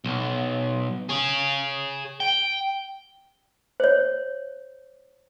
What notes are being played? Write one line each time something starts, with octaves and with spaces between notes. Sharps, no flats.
B1
G#4 C#5
G5
C5 C#5